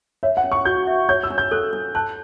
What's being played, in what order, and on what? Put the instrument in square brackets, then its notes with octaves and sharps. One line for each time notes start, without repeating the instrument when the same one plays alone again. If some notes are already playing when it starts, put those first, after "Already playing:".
[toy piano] C#5 [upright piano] E5
[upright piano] F#5
[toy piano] C#4
[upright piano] C#6
[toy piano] F#4 [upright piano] G6
[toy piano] E5
[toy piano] C#5 [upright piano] G6
[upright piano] E6
[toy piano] D4
[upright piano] G6
[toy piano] A4 [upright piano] F#6
[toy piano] D4
[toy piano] A5 [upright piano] F#6